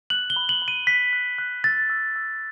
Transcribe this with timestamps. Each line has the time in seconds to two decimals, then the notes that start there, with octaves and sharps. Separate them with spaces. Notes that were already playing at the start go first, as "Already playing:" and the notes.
0.10 F#6 F#7
0.30 G7
0.36 B5
0.49 F#7
0.62 B5
0.68 D#7
0.87 F#6 B6
1.13 F#6
1.38 F#6
1.64 E6 A6
1.90 E6
2.16 E6